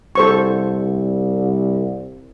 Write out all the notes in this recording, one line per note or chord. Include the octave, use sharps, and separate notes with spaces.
C2 A4 C5 C#6